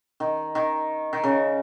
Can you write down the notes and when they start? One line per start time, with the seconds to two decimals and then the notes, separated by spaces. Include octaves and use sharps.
0.20 D#3
0.55 D#3
1.13 D#3
1.24 C#3